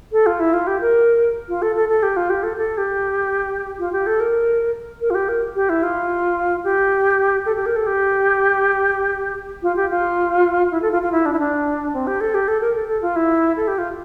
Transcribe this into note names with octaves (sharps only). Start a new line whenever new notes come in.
A4
F4
E4
F4
G4
A#4
F4
A4
A4
A4
G4
F4
G4
A4
A4
G4
F4
G4
A4
A#4
A#4
F4
G4
A#4
G4
E4
F4
G4
A4
G4
A#4
A4
G4
F4
G4
F4
E4
A4
F4
F4
E4
D4
E4
D4
C4
G4
A4
G4
A4
A#4
A4
A4
F4
E4
A4
G4
F4